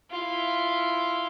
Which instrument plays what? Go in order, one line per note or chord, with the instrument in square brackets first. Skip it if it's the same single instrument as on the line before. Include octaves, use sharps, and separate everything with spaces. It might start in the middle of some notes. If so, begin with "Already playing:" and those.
[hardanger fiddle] E4 F4